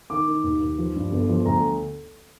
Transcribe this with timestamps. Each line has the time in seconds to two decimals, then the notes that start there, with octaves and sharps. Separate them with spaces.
0.10 D#3 D6
0.28 D#3
0.44 D#2
0.60 D#2
0.78 F3
0.96 G2
1.11 G1
1.29 F3
1.45 D2 A#5